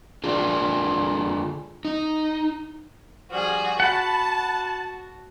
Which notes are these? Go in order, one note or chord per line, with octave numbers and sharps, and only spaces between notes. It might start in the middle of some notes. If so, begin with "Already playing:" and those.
D3 D4 F4 G#4
D#4
D3 F3 G3 F#4 G#4
F#4 F#5 A5 B5